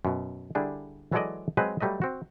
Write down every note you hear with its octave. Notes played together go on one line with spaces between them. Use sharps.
F#2 B2
D3 G3 D4 E4 G#4
E3 F#3 G#3 A4 D5 D#5
F#3 G#3 C4 B4 C5
F#3 G3 A3 B4 D#5
C4 F#4